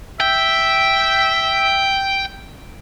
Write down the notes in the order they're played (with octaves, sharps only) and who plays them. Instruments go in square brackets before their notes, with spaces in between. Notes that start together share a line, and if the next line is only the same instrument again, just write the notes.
[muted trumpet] E5 [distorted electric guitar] G5